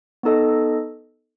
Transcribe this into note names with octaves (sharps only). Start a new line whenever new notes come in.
B3 D#4 A4 D#5